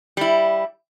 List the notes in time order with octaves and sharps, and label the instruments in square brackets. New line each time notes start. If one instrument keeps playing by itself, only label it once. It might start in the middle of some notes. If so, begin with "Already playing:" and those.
[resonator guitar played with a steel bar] G3 E4